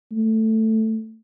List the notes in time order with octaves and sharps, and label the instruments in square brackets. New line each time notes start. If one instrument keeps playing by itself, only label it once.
[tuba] A3